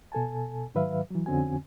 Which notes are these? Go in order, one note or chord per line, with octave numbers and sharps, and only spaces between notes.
B2 A4 G#5 A5
G#2 D#3 F#3 B4 E5 F5
E3 F#3
F2 D3 C4 C#4 F#4 G#5